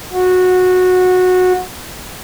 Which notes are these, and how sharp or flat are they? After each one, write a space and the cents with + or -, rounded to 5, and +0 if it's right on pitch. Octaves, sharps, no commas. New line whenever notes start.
F#4 -15